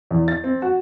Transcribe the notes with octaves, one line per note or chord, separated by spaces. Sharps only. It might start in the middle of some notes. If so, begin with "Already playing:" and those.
E2
A6
C4
F#4